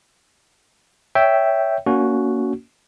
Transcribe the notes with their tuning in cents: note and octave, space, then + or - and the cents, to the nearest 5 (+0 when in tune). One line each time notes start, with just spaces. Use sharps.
C#5 +15 E5 +0 G5 -5
A#3 +0 C#4 +35 F#4 +0